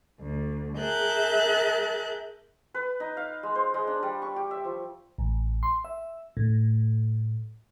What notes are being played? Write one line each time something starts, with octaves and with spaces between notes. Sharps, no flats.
D2
G#4 A#4 E5 A5 F#6 G6
B4
D#4
F5
G#3
C5
G#3
D4
G3
C#6
G4
E5
F3
A1
C6
E5
A2